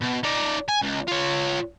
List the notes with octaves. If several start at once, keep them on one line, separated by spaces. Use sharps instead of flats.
B2
D#4 D5
G#5
C#2
F4 C#5